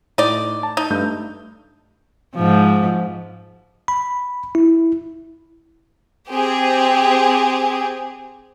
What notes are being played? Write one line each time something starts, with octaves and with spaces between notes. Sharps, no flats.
A2 D#4 D5
A5
D#4
G2 A3 G6
G#2 F3
B5
E4
C4 G4 G#4